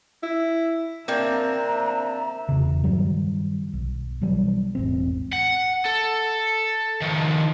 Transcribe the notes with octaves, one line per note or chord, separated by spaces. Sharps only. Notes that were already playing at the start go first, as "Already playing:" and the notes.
E4
A#3 C4 D4 E5 A#5
E1 E2 C#3
G2 D#3 F#3 G3
B1
B2 E3 F#3 G3
E1 A1 C4
F#5
A4
D#3 F3